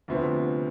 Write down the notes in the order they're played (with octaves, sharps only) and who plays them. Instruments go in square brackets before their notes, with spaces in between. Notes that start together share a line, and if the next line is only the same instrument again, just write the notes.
[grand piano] D2 C3 F3 B3